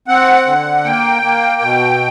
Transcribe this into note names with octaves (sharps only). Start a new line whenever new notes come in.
C4 F#5
D3
A#3 G5
A#3
B2